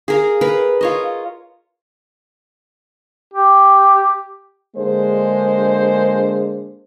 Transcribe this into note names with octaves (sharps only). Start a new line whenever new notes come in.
G#4 A#4 F5
A#4 B4
F4 C#5 D#5
G4
D3 G#3 A#3 D4 G#4 C5